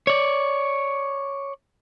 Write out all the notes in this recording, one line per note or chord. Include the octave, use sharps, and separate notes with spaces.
C#5 D5